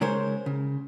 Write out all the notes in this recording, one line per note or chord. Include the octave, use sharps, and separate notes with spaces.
C#3 G#3 A#4 C5 C#5
C#3